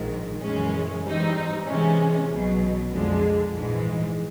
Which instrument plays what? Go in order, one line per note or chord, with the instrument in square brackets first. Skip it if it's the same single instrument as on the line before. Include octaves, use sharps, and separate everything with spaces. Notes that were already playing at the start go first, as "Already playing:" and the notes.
Already playing: [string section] A#1 G#2 D#3
F#2 C#3 E3 G#3 C#4
G#2 E3 G3 C4 D#4
C3 E3 G#3 C#4
B1 B2 F#3
F2 D3 F3 G#3
A#1 G#2 E3 G#3